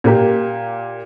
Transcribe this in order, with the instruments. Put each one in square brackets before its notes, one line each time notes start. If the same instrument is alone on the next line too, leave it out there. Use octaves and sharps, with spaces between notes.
[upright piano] A#2 A#3 G4